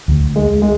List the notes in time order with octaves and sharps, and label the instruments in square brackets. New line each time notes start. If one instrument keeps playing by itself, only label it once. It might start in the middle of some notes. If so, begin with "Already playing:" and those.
[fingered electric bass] D2 D3 A3
[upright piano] G#3
G#3